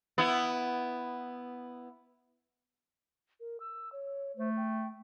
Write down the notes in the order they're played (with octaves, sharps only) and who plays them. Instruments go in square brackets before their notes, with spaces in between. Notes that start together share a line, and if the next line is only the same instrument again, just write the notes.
[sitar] B3 E4
[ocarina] A#4
E6
C#5
[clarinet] A3 [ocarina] C5
[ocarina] G5